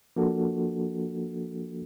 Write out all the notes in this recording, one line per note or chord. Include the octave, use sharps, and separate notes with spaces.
F3 A#3 D4 F#4 A4